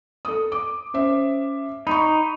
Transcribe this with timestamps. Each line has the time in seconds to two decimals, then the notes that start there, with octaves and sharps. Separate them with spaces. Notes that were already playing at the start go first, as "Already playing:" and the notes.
0.25 A4 D#6
0.52 D6
0.94 C#4 C5 E5
1.87 D#4 B5 C#6